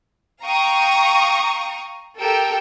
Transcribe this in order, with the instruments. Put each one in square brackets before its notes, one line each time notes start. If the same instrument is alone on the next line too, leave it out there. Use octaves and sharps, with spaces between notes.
[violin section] F5 G5 A#5 C#6 D#6
G4 A4 A#4 G5 E6